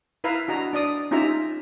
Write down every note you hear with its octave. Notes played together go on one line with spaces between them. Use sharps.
E4 B4 E5 F5 A#5
D4 F#4 D#5 A#5
D4 D5 D#6
C#4 D#4 F4 G4 E5 A#5